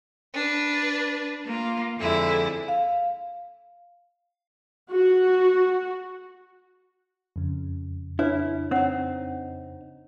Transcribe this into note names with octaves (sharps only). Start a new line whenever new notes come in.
D4 B4
A#3 F4
F2 D3 G#3 E4
F5
F#4
F2 C#3
D4 E4 B4 C#5
C4 D#4 C#5 F#5